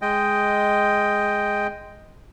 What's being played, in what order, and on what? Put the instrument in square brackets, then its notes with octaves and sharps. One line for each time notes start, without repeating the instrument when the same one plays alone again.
[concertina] G#3 D#5 G5